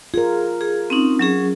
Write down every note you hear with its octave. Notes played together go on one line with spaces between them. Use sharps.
F4 G#4 A#4
G#4
C4 C#4 D#4
F#3 C#4 G#4